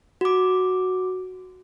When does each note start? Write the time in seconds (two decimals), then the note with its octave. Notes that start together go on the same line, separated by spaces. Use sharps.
0.21 F#4 D6